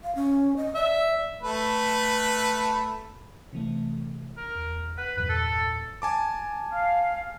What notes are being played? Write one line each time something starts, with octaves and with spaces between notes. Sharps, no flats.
F5
C#4
D#5
D5 E5
A3 B4
C3 E3 A3
A#4
E2
B4 F#5 F#6
E2 G2 A#2 B4
A4
G#5 A5 D6
F5